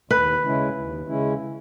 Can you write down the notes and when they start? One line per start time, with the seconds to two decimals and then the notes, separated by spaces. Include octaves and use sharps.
0.10 D#2 B4
0.43 C#3 G#3 C#4 E4
0.76 D#2
1.07 C#3 G#3 C#4 E4